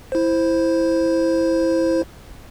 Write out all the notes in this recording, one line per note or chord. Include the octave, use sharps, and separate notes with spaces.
E4 C5